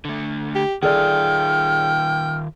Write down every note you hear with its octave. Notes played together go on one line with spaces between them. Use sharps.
D3 A3
G4
D#3 F4 G#4 A4 D5 G5 F6